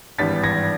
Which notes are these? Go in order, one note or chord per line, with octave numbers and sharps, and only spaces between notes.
G#1 G2 E3 G3 A6 B6
G#6 A#6